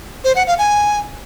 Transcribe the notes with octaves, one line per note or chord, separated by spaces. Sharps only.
C5
F#5
F5
G#5